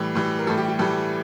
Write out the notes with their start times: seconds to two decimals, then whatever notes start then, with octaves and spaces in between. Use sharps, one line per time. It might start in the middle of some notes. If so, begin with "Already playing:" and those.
Already playing: A2 E3 G3
0.15 A2 E3 G3
0.39 A#4
0.47 A2 E3 G3 A4
0.58 G4
0.68 G4
0.79 A2 E3 G3 A4